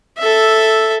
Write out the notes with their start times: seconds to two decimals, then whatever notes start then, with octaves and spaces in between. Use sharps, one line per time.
0.19 A4 E5